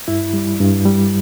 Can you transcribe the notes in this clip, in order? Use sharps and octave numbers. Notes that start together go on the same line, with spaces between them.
G2 E4
G3
G2
G3